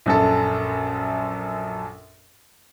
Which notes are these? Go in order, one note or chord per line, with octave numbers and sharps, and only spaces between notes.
A#1 F#2 A4